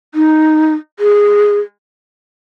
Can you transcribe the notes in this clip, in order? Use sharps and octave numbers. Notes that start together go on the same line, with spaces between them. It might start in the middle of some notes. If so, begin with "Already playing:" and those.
D#4
G#4